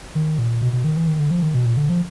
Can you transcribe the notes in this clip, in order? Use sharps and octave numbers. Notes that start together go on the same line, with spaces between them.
D#3
A#2
B2
B2
D#3
E3
D#3
D3
F3
D#3
B2
A#2
D3
F3